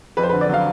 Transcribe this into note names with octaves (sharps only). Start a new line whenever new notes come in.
F2 B4
C5
B4
D3
D5
F#3 F5